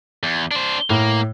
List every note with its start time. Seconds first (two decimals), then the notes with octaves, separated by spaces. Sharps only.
0.23 E2
0.51 D4 C5
0.90 A2 A#3